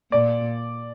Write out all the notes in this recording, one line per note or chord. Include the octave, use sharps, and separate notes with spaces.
A#2 D5